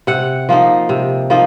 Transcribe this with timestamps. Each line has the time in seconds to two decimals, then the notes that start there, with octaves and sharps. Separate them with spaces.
0.07 C3 F#5
0.49 F3 A#3 D#4
0.89 C3
1.30 F3 A#3 D#4